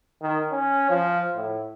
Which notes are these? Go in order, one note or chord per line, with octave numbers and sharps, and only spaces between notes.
D#3
C#4
F3
A2